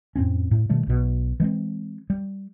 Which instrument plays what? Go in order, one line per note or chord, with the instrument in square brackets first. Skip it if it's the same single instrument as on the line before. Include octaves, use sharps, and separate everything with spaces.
[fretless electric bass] F2 A2 C4 C#4
A2
B2 D#3 G3 A3
B1 B2
E3 G#3 A#3 C4
G3